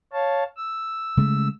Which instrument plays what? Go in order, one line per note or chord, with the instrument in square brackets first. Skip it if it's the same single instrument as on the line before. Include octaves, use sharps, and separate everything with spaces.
[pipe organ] C#5 F5 A5
E6
[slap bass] C#3 G#3 A3